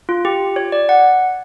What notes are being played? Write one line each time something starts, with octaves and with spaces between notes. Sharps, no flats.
F4
G4
C#5
D5
F#5